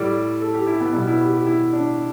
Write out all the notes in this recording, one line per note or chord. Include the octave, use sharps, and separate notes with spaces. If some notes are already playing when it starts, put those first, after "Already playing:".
Already playing: A2 G3 D5
A4
G4
E4
B3
B2 G3 B3
E4
G4
G4
E4
D4